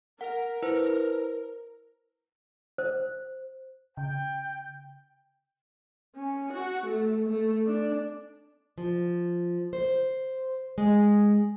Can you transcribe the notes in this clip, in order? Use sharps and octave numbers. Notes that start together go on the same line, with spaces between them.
A#4 F#5
E4 B4 C5
C5
C#3 G5
C#4
F#4
A3
A3
D4
F3
C5
G#3